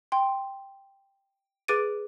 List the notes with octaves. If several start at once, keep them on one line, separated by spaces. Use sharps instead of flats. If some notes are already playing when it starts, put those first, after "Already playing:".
G5 C6
G#4 B4 D6 A6 D7 D#7